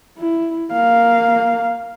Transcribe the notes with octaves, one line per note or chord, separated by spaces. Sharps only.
E4
A#3 F5